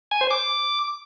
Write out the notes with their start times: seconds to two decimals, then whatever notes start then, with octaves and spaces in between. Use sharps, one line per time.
0.11 G#5
0.21 C5
0.31 D6